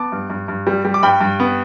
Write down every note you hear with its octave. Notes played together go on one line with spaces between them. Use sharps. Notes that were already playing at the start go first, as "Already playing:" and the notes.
Already playing: B3 A5 D6
G2
G2
G2
G3
G3
D6
G2 G5 B5
G2
B3